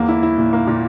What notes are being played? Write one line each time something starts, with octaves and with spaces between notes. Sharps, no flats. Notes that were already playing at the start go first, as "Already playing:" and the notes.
Already playing: E2 A#3
E4
E4
A#2
A#3
A#2